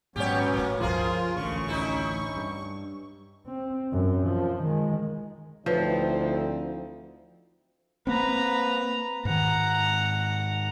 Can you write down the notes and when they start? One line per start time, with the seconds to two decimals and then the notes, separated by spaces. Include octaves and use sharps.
0.16 G#2 D#3 F#3 B3 C#4 G4 C#5
0.53 A2 A3 A#3
0.81 C#2 G2 F3 F4 G#4 A#4
1.36 A1 D2 C#3 C#6
1.68 C#4 D#4 E4
2.37 G2
3.46 C4
3.92 F#2
4.26 F3
4.63 D#3 G#3
5.66 D2 F3 C4 D#4 E4 B4 C#5
8.07 A#3 C4 B4 A#5
9.25 G#2 D#3 F#5 A#5